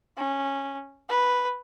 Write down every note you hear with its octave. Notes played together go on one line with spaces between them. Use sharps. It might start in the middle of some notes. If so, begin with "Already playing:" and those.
C#4
B4